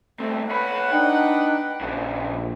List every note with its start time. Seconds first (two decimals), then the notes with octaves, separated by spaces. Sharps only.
0.20 B1 A3 C4
0.51 B4 C#5 F#5 B5
0.92 D4 D#4 G5
1.81 A#1 A#2 C#3